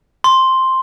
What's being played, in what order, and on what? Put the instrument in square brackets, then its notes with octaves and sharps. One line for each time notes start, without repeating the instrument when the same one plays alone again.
[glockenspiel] C6